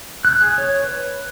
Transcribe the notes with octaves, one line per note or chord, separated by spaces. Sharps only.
F#6
G#4
C#5
B4